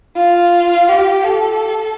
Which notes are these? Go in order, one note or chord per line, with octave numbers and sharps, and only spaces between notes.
F4
G4
A4